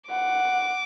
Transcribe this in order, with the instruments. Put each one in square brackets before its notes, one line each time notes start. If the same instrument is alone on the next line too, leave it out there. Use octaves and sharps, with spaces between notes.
[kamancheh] F#5 [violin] D6